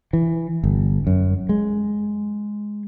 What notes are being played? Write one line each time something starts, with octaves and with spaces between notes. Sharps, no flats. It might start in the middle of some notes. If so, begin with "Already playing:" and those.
E3
G1
F#2
G#3